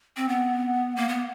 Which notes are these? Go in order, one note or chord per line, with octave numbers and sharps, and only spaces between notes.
C4
B3
A#3
B3